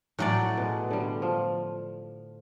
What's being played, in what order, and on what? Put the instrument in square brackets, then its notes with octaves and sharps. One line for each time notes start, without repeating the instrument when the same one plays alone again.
[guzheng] A2 F#3 D5 [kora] C#4 F#4
[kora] B2 G#3
D3 G3
F3